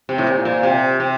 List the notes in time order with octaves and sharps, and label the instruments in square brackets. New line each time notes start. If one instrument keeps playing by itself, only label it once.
[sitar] C3
A2
A#2
A#2
C3
C3